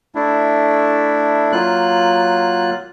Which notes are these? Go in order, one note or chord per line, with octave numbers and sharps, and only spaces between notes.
A3 D4 E4
F#3 A#3 F4 F#6